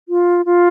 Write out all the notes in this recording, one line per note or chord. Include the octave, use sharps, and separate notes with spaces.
F4
F4